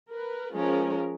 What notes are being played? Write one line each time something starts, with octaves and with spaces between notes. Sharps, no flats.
A#4 B4
F3 G#3 C#4 F4 A#4